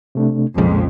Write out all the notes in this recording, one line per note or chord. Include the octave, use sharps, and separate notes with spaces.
C3 A3 D4
B1 F2 A#2 C#3 G#3